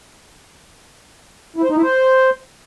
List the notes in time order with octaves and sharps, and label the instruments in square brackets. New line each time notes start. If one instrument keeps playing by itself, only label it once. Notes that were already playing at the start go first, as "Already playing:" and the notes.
[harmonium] E4
C5
D#4
E4
C5